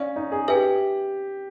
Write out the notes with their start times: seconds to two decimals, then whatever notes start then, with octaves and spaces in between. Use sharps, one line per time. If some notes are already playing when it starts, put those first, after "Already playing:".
Already playing: C#4 D5 F5
0.16 D#4
0.32 G#4
0.48 G4 B4 E5 G#5